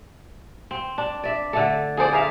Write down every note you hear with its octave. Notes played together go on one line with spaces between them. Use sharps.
C4
D4
D5 E5
D3 A3 A4
G#4 A4 C5 D5
G#4 A#4 E5 F5